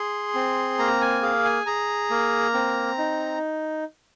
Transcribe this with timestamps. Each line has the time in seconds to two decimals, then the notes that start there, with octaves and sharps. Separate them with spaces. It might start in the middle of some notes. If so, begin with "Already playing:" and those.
Already playing: G#4 C6
0.35 C4
0.79 A#3 A#5
1.01 G#5
1.22 G#4 F5
1.45 G#5
1.66 G#4 A#5
2.10 A#3
2.54 C4
2.98 D#4